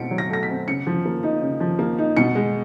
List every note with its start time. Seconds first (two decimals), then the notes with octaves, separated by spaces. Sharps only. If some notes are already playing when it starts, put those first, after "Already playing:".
Already playing: B2 A3 C4 C#7 D7
0.11 F#3
0.18 A#6
0.30 A3 A#6
0.43 B6
0.49 C4
0.68 C#3 C#7
0.87 F3
1.05 A#3
1.23 D#4
1.41 C#3
1.60 F3
1.79 A#3
1.99 D#4
2.17 B2 C#7
2.35 G#3